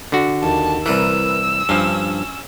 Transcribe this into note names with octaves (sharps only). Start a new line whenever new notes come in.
D3 F#4
D#2 A5
C2 E3 A#4 B4 E6
G2 F3 C#4